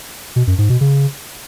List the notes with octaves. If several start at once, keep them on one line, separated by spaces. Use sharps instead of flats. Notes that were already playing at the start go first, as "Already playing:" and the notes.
B2
F#2
G#2
B2
C#3